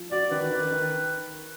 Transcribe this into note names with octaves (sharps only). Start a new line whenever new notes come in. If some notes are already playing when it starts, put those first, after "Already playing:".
Already playing: F3
F#4 D5
D#3 B4
D#3
D#3